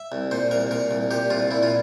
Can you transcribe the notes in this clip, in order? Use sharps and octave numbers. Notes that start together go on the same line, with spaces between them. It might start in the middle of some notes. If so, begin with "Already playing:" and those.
Already playing: E5
C2
A#2 C5
C2 A#4
A#2 A#4
C2
A#2 G4
C2 F4
A#2 E4
F4